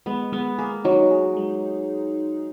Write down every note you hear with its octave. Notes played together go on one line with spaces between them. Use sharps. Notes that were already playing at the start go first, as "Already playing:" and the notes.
G#3 B3
G#3 B3
A#3 G#4
F#3 D#4
G#4
G#3